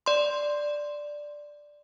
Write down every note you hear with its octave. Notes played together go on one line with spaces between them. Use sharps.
D5 C6